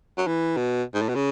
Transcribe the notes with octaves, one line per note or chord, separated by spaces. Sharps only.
F#3
E3
B2
G#2
A2
B2
C#3